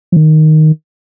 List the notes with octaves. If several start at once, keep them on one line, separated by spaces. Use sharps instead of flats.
F3
D#3